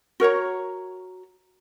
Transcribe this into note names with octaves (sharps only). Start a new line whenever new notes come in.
F#4 A#4 C#5 A#5